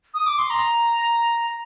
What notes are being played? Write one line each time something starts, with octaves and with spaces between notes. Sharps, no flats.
D#6
D6
C6
A#5